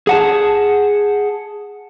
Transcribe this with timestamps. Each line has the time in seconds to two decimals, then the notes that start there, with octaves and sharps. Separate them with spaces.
0.07 G#4 F#5 A5